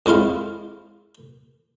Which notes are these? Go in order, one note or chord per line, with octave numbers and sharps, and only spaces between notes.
F2 G#3 E4 F4 F5